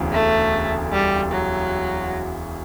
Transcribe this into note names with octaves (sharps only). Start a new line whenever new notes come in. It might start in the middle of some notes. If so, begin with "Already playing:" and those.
Already playing: E1 D2 C#3 E3
A3
G3
F#3